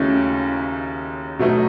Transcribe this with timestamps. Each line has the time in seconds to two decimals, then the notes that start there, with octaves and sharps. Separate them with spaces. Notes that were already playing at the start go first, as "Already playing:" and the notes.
Already playing: D#2 C#3 F#3 A3 C#4 D#4 E4
1.39 B2 F#3 A3 D#4